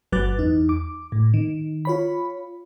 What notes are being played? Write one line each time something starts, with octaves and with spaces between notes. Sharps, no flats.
G1 F#3 B4 D6 F#6 A6
E2 D#4
D6
A2
D#3
F4 C#5 B5